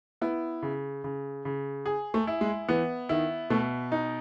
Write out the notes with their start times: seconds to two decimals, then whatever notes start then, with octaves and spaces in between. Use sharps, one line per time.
0.21 B3 E4
0.63 C#3
1.04 C#3
1.45 C#3
1.86 G#4
2.14 A3
2.27 E4
2.41 G#3
2.69 E3 B3
3.09 D#3 E4
3.50 B2 A3
3.92 D#4